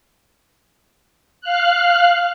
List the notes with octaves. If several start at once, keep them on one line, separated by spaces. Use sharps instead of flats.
F5 F6 F#6